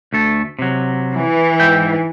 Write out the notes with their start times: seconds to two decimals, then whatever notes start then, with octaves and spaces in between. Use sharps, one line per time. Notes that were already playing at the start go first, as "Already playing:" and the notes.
0.13 D2 A3 A4
0.59 C3 F#3
1.14 E3
1.60 G#2 E5 G5